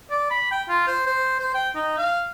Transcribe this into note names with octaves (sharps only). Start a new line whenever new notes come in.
D5
B5
G5
F4
C5
C5
C5
G5
D#4
F5